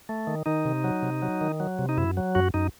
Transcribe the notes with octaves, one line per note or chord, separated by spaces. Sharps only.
A3
D#3
D#3 D#4
C3
F#3
C3
F#3
D#3
F#3
C3
D#4
F#2 E4
F#3
F#2 F#4
F#2 D#4